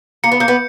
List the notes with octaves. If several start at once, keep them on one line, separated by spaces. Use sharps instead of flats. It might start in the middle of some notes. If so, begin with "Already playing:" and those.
A#3 C#7
B3
A#3 G6
B3